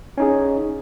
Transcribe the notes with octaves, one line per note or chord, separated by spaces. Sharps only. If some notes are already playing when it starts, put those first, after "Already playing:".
C#4 D#4 G#4